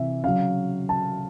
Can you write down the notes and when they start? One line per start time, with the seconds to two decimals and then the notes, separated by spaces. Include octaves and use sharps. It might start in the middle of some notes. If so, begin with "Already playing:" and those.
Already playing: C3 E3 E5
0.24 C#3 F#3 F5
0.89 A5